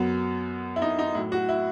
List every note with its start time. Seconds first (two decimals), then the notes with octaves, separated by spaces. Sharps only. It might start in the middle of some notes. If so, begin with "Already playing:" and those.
Already playing: F#2 F#3 B3
0.76 E4
0.82 D#4
0.99 D#4
1.15 A2 F#3 E4
1.32 F#4
1.49 E4